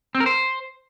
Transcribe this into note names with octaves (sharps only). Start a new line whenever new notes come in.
C4
A#4
C5